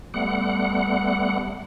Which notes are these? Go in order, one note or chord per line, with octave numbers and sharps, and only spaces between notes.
G3 A3 B3 F#5